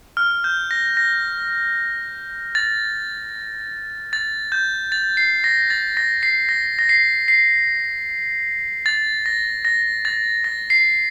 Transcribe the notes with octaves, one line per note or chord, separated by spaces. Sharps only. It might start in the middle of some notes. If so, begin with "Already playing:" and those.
F6
G6
A#6
A#6
A6
A6
G6
A6
C7
A#6
A6
A#6
C7
A#6
A#6
C7
C7
A6
A#6
A#6
A6
A#6
C7